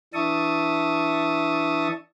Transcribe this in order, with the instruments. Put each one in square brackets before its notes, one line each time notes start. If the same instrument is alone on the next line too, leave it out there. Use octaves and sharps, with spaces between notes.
[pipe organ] E3 D4 E5 A5 C#6 D#6